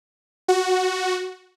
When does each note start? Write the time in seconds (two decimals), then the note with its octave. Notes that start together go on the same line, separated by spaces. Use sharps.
0.48 F#4